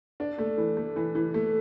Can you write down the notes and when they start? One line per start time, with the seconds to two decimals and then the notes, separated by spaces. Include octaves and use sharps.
0.20 D4
0.38 A3
0.58 E3
0.77 A3
0.96 E3
1.15 E3
1.34 A3